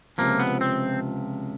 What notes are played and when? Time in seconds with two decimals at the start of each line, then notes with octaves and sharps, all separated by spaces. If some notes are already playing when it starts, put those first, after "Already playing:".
0.18 C#2 C3 F3 A#3
0.40 B3
0.61 C4